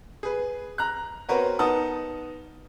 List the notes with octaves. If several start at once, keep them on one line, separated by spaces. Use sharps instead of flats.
G#4 B4
A#5 F#6
B3 C4 F#4 A#4 B4 C#5
B3 D#4 A#4 F#5 A5 D#6